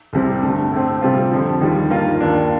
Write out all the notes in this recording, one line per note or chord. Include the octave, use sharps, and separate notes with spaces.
C2 C3 G3 C4
G2 D3 A3
A2 A3 C4
C3 G3 C4 F4
F2 D3 F3
D#2 D#3 G3
G2 D#3 A#3 F4
D#2 D#3 A#3 D4